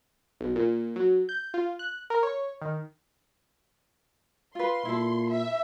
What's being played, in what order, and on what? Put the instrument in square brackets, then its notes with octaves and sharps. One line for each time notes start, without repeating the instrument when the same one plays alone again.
[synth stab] B1
A#2
F#3
G6
F4
F#6
A#4
C#5
D#3
[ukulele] F4 B4 [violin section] C6
[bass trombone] A#2 [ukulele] E4 A4
[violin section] E5